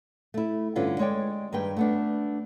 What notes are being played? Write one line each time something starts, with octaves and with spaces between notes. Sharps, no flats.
A3 E4
G2 D3 C#4 F4 B4
G#3 C#5 D5 G5
G2 D#3 G#4 B4 G5
A3 B3 D4